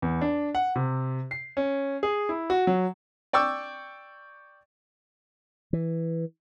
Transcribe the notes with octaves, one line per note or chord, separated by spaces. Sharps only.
E2
D4
F#5
C3
C7
C#4
G#4
E4
F#4
F#3
D5 G5 C#6 D6 E6
E3